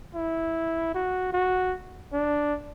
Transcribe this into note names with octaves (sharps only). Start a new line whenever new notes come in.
E4
F#4
F#4
D4